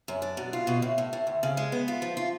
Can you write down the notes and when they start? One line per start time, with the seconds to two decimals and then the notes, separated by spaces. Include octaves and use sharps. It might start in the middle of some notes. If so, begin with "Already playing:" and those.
0.08 F#2
0.22 D4
0.37 B2
0.53 F4
0.67 B2
0.82 A2
0.98 A2
1.13 A2
1.27 D2
1.43 C#3
1.57 G#3
1.72 B3
1.88 F4
2.02 F3
2.17 F4